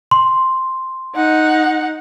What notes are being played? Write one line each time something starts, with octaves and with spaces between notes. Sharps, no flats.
C6
D#4 F#5